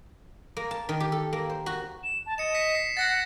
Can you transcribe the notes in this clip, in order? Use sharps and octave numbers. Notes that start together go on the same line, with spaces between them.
A#3
A5
D#3
G4
A4
A#3
C5
F#4
E7
A5
D#5 C#7 E7
B6 C#7
C7
F#5 A6 A#6 C#7